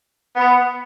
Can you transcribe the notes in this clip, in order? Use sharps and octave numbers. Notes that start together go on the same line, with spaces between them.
B3